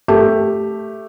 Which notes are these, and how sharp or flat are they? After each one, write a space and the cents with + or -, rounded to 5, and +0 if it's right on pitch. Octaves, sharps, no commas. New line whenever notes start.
A3 +0 G4 +0